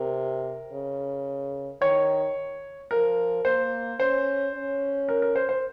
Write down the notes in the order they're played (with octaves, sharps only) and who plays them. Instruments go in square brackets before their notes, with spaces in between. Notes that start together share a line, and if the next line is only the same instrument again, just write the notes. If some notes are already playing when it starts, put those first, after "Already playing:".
Already playing: [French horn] C3 [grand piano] A#4
[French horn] C#3
[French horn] D#3 [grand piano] C#5
[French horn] F3 [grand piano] A#4
[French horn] A#3 [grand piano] C5
[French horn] C#4 [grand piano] C5
[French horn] C#4
[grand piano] A#4
A#4
C5
C5